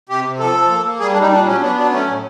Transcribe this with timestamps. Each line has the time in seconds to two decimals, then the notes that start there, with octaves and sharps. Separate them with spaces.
0.09 C3 G4
0.25 C3
0.39 F3 A4
0.55 F3
0.70 A#3
0.85 A#3
1.00 G3 G#4
1.11 D4
1.16 G3 D#4
1.31 A#2 D4
1.46 F#3 C#4
1.61 B3 D4
1.76 F#3 D4
1.91 A3 C#4
2.07 A2